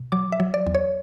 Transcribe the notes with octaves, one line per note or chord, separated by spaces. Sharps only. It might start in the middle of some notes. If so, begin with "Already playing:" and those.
Already playing: B2
F#3 D6
E5
F#3
D5
E2
C#5